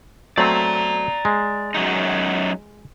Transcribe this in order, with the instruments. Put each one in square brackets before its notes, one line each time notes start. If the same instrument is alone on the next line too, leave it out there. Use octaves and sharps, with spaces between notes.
[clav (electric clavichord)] F#3 A3 C4 [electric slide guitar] D5 A#5
[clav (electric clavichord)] G#3
[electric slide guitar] F#2 F#3 D#4